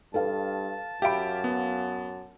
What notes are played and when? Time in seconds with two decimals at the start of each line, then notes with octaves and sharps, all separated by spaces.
0.14 G2 A4 B4 F5 A5
1.02 F#2 G4 E5 F5 B5 D7
1.44 B3